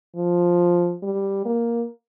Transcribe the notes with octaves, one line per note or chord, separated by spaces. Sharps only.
F3
G3
A#3